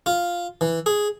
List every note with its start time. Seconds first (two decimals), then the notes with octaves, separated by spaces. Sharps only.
0.06 F4
0.61 E3
0.86 G#4